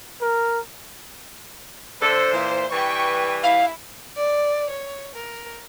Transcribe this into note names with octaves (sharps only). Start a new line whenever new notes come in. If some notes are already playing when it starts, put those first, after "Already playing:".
A#4
D3 D4 A4 C5
A#2 E3
E3 G3 B4 G5 C#6
E4 F5
D5
C#5
A#4